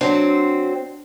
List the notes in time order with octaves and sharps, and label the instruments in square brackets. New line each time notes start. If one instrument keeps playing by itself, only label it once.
[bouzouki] F#3 C4 [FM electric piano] D4